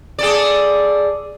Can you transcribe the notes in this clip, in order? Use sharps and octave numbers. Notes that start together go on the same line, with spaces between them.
G#4 A4 D5